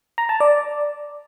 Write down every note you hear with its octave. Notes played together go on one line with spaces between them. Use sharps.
A#5
A5
D5